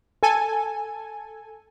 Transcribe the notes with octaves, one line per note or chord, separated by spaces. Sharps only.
A4 G#5